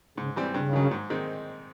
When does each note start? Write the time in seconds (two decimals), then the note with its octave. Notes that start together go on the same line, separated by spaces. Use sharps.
0.18 G#2 C#3
0.36 E3 G3 C4
0.54 G2 C#3
0.73 D#3 F#3
0.91 G#2
1.10 D#3 G#3 C4